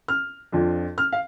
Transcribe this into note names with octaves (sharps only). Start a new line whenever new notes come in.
F6
F2 F3 D4 F4
F6
F5